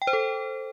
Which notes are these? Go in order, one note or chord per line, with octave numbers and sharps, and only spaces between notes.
G5
C5
A4